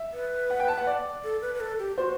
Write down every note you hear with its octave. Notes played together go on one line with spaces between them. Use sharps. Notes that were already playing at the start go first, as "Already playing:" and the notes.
Already playing: E5
B4
F#5
G5
A5
F#5
D5
A4
B4
B4
A4
G4
F#4 C5